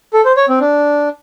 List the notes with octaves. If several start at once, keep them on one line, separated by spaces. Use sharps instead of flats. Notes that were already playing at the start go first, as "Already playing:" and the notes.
A4
C5
C#5
C4
D4